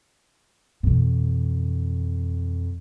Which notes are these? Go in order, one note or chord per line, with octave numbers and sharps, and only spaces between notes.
F2 B2 E3